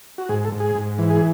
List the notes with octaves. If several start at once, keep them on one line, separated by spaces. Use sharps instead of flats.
F#4
G#2 G#4
A4
G#2
G#4
G#2
E3
G#4